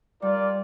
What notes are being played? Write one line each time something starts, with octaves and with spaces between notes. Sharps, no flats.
G3 F4 A#4 D5